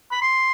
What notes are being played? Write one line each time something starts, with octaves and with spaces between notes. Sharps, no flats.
B5
C6